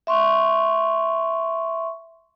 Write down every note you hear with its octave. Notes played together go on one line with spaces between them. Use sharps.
E5 C6 C#6